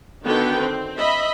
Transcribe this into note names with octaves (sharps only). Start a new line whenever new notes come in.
D3 D#3 B3 F#4 B4 G5
C4
D#5 E5 B5